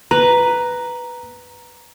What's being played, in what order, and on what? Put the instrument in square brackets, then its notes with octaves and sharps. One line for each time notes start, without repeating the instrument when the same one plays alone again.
[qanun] B4 [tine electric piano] A#5